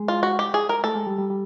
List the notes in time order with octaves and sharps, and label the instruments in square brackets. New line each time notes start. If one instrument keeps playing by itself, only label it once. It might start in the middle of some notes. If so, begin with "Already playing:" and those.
Already playing: [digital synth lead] G#3
[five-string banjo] F4
F#4
G4
G#4
A#4
[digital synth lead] A3 [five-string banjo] A4
[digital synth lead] G#3
G3
G3
G3